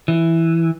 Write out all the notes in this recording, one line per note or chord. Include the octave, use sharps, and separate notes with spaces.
E3